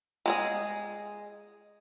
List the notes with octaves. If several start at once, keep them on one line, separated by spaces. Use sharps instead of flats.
G#3 G#4 D#5